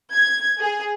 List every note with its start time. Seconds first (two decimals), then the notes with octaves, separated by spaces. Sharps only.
0.13 G#6
0.61 G#4